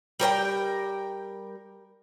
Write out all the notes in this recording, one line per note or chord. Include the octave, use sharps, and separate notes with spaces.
G3 A#4 B4 G5